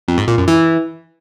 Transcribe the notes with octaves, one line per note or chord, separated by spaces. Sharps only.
F2
G#2
A#2
F#2
E3